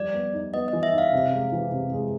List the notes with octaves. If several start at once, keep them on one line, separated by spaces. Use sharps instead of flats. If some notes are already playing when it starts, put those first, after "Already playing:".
Already playing: F3 G3 D5
B3
D#4
B3 D#5
E3 D#5
E5
D#4
F5
C3
G#3
E3
C3
G#3